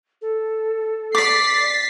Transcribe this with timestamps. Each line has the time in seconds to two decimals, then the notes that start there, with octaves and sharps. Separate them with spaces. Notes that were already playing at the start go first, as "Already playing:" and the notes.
0.21 A4
1.15 D5 D6 A6 B6 C7